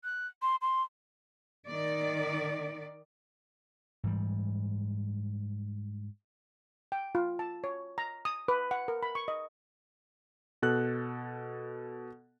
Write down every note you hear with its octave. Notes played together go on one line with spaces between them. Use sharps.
F#6
C6
C6
D#3 D5
G#2 E3 G3
G5
F4
A5
C#5
A#5
D#6
B4
F#5
A#4
B5
C#6
D#5
B2 A4 F#6